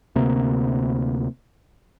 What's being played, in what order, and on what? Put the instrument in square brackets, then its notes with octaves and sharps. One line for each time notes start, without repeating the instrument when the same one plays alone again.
[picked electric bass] D2 C3 A#3